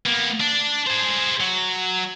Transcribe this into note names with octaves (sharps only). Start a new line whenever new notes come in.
A#3 B3
D4
G#4 C5
F#3